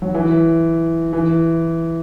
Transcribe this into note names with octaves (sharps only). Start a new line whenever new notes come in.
F#3
E3
E3